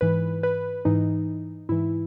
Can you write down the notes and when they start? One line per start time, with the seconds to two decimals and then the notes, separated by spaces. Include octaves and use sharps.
0.01 G#2 E3 B4
0.43 B4
0.85 G#2 E3 D#4
1.69 G#2 E3 E4